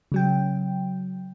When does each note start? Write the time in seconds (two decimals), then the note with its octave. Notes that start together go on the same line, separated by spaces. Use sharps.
0.12 C#3 F#3 G5